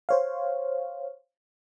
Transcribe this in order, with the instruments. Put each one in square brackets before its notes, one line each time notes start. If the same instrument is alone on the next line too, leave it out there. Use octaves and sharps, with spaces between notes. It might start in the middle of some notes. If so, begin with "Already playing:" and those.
[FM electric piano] C5 C#5 F5